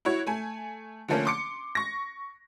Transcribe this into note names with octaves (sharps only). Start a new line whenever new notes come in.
E4 F#4 C#5
A3 G#5
D3 F3 A3 A#3 C#4
C6 D6 C#7
C#6 A#6